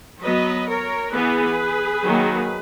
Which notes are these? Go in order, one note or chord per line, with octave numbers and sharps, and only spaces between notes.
F#3 B3 B4 D#5
A#4 C#5
E3 B3 G#4 B4
D#3 F#3 A#3